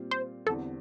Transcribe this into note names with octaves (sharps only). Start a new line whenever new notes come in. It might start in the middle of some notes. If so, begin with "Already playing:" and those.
Already playing: A#2 G3 C4 F4
C5
E2 D3 G3 C4 E4 A4